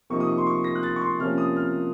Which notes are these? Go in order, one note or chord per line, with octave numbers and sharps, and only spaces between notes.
C3 F3 A#3 D#4 C#6
D#6
C#6
C6
C#6
A#6
F#6
A6
C#6
C6
C3 F3 A#3 C#4 F6
D#6
F6